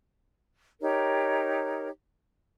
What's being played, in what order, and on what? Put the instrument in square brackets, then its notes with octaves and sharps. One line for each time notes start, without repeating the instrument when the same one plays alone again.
[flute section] D#4 G4 A#4 C#5